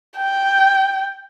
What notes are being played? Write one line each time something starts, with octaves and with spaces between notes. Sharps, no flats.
G5